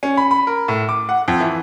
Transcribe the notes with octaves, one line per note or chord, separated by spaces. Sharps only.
C#4
B5
B5
A#4
A2
D6
F#5
F2
E3